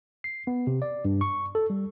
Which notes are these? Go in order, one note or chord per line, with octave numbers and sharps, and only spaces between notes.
C7
B3
C3
D5
G2
C#6
A4
G3